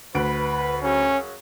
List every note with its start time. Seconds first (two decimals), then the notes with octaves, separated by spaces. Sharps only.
0.15 D2 B4 D7
0.83 F#2 C#3 F#3 C#4